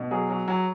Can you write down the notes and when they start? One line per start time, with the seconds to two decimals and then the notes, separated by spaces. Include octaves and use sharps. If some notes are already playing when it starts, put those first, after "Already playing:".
Already playing: B2
0.11 F#3 G#4
0.30 F#3
0.48 F#3